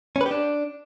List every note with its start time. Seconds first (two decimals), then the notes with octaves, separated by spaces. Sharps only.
0.16 C#4
0.21 B4
0.26 G4
0.31 D4